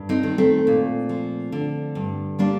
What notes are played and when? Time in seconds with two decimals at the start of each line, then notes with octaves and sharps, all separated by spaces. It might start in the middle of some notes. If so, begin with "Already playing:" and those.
Already playing: G2
0.09 C4 D#4
0.23 D#3
0.38 A3 C4
0.67 A#2
1.09 F3
1.52 D3
1.95 G2
2.39 G3 A#3 D4